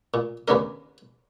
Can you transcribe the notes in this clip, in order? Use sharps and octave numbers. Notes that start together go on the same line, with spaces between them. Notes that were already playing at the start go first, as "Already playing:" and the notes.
A#2
D#2 C#3 B3 D4 A#4